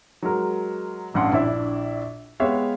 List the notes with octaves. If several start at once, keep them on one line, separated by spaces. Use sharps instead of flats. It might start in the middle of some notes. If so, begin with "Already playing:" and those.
F#3 G#3 A#4
A1 G2 F#5 C6
A#1 D4 E4 E5
G#3 B3 G4 C#5 E5 F5